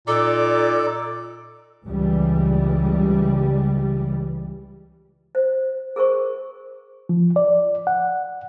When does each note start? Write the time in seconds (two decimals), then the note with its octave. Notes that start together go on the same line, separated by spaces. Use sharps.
0.07 A#2 D#4 A4 D5 D6
1.84 C#2 E3 G3
5.35 C5
5.96 G#4 A#4 C5 C#6
7.09 F3
7.36 D5
7.87 F#5